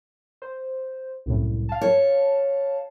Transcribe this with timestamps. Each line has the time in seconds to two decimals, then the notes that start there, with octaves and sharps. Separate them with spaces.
0.42 C5
1.26 C2 F#2 A2
1.69 F5 A5
1.81 C#5